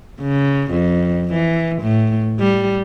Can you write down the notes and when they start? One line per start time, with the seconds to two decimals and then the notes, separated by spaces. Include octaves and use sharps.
0.21 C#3
0.71 F2
1.33 E3
1.82 A2
2.40 G3